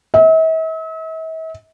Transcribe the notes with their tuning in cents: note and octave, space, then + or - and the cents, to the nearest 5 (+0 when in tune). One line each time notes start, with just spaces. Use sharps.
E5 -45